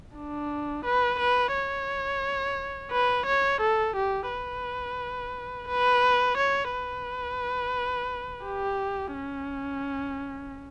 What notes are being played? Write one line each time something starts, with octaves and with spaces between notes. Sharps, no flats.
D4
B4
B4
C#5
B4
C#5
A4
G4
B4
B4
C#5
B4
G4
C#4